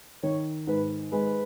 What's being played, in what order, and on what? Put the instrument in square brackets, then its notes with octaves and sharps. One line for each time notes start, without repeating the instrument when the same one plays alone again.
[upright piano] D#3 [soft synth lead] C#5
[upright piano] G#2 [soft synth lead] B4
[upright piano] G#3 [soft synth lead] B4